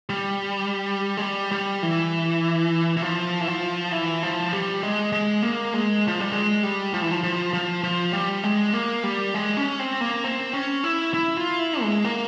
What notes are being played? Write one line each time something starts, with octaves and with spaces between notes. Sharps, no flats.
G3
G#3
G3
G3
E3
E3
F3
E3
F3
E3
F3
G3
G#3
G#3
A#3
G#3
F3
G3
G#3
G3
F3
E3
F3
F3
F3
F3
G3
G#3
A#3
G3
G#3
C#4
C4
A#3
C4
C#4
E4
E4
F4
E4
G#3
A#3